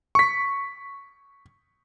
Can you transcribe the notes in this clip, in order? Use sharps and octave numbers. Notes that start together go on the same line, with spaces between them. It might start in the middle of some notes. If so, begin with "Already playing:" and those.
C#6 B6